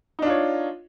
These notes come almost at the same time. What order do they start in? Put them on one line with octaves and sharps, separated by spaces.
D#4 D4 F4 C#5